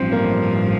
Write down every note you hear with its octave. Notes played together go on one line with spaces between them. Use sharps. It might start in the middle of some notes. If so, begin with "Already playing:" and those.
Already playing: A1 G2 F3 C4
A#3